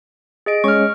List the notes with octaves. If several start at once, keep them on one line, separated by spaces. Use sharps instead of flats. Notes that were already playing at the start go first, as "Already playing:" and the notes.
G#4 D#5 D7
G#3 C#4 C#5 C#6 F6